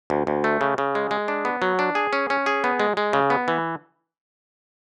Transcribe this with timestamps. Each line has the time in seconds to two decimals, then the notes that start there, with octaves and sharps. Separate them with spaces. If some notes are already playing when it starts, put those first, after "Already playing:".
0.10 D2
0.27 D2
0.44 A3
0.61 C#3
0.78 C#3
0.95 G#3
1.11 G#3
1.28 D4
1.45 B3
1.62 F#3
1.79 D4
1.95 G#4
2.13 C#4
2.30 C#4
2.46 G#4
2.64 B3
2.80 G#3
2.97 G#3
3.13 C#3
3.30 B3
3.48 E3